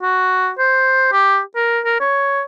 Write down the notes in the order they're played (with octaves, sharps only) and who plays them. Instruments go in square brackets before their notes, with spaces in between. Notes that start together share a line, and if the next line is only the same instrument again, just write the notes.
[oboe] F#4
C5
G4
A#4
A#4
C#5